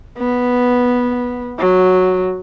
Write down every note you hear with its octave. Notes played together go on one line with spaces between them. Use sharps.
B3
F#3